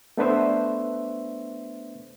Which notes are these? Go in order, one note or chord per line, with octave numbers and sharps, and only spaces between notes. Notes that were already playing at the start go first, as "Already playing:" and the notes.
A3 B3 D4 B4 C5 E5